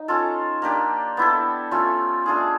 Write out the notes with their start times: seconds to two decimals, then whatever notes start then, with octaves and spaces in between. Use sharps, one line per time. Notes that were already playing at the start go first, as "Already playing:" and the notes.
Already playing: D#4
0.08 C#4 F4 A4
0.62 A#3 D4 G4
1.17 B3 E4 A4
1.71 A3 C#4 F4
2.26 A3 D4 F4 G#4